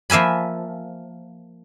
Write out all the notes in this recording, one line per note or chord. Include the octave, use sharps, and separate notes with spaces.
F3 A#3 E5 G#5 B5